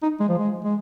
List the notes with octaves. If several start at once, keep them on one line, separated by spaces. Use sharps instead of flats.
D#4
G#3
F3
G#3
G#3